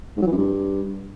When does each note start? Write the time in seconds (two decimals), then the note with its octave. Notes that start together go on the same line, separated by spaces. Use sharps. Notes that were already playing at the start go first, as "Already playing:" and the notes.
0.17 G#2
0.22 F#3
0.27 E3
0.32 F#2
0.37 G2